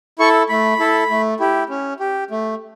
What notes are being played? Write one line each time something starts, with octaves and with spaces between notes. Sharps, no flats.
E4 A4 C#6
A3 B5
E4 A4
A3
E4 G4
C#4
G4
A3